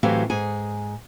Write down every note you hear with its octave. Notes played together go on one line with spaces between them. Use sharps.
A2 E3 F#3 C4 G4 F5
G#2 G#4 G#5